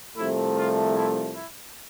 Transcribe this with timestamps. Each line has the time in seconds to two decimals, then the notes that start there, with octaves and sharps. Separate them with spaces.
0.17 C2 C3 F3 A3 E4
0.56 F4
0.94 E4
1.34 E4